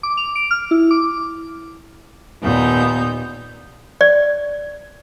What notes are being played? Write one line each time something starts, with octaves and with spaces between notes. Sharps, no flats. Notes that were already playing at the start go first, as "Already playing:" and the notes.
D6
F7
D7
F6
E4
D6
D#2 A#2 B3 D#4 G6
D5